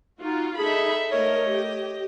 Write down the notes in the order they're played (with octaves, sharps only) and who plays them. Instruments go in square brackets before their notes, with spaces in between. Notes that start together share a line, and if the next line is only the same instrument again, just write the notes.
[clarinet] D#4 [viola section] F4 F#4
[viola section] D#4 B5 [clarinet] G#4 [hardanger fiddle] A4 E5
[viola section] A3 A#4 [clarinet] C#5 [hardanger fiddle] D#5
[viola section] G4